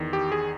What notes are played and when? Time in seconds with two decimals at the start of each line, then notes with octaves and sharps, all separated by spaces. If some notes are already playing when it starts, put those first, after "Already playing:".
Already playing: E2 D#3
0.13 G4
0.32 G#4